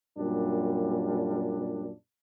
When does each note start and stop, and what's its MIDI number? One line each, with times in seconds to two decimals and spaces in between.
0.17 1.90 42
0.17 1.90 46
0.17 1.90 55
0.17 1.90 62